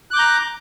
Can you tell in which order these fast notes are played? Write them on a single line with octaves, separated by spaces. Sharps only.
F#6 D6 G6 A#5